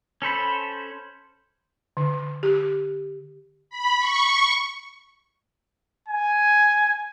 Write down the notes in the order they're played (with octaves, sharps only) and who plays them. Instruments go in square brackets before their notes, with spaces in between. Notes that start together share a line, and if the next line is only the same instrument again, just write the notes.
[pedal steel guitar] C#4 A4 C5 B5
[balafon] D3
G4
[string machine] B5
C#6
[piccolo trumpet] G#5